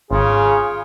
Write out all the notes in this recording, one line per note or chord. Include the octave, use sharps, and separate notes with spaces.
G#1 C#3 F4 G#4